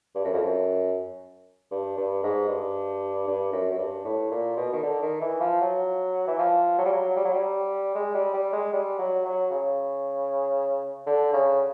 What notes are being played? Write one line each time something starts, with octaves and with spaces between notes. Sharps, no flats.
G2
F#2
F2
F#2
G2
G2
G#2
G2
G2
F#2
F#2
G2
A2
A#2
B2
D#3
D3
D#3
E3
F3
F#3
E3
F3
F#3
G3
F#3
G3
F#3
G3
G#3
G3
G3
G#3
G3
F#3
F#3
C#3
D3
C#3